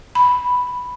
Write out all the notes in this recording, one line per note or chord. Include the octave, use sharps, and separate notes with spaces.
B5